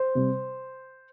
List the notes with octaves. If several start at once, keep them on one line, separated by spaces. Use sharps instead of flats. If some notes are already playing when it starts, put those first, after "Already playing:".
Already playing: C5
C3 G3